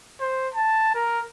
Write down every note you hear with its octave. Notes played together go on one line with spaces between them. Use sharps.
C5
A5
A#4